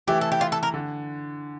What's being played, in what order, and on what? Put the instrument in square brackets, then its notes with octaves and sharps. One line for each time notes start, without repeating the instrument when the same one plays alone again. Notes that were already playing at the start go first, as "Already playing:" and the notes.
[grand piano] E3 A3 E4 [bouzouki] G4
[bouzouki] A4
G4
F4
A4
A#4
[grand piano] D3